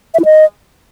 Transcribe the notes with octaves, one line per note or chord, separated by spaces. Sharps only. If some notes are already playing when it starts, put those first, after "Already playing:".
E5
E4
D#5